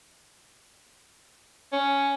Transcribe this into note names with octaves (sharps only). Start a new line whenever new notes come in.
C#4